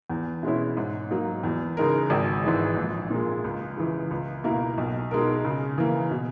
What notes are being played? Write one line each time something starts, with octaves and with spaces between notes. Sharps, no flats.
E2
B2 G#3 C#4 E4
G#2
F#3 A#3 D#4
E2
C#3 G#3 D#4 A#4
G#1
G#2 E3 G#3
A#1
A#2 G#3
C#2
C#3 E3
C#2
B2 A#3 E4 A#4
B1
B2 G#3 D#4 A#4
C#3
E3 A#3
B2